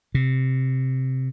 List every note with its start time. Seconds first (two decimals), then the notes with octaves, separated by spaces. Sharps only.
0.15 C3